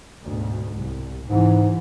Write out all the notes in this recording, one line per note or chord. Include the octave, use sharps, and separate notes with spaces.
D2 G#2 B2
C2
G#2 C3 E3